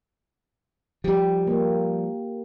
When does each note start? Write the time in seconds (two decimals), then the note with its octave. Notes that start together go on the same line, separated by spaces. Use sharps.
1.04 F3 G3 G4
1.47 A#3